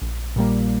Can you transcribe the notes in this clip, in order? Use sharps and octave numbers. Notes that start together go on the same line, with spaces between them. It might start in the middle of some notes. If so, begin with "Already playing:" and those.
A#1
A#2 G3 A#3